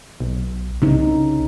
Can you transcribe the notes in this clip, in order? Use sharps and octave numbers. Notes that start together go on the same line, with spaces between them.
B1
C2 C#3 D#4